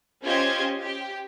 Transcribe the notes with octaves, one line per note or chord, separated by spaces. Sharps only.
C#4 F4 G4 C5 D#5 G#6
G4